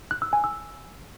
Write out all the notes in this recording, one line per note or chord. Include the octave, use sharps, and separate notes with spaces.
F#6
E6
G#5
E6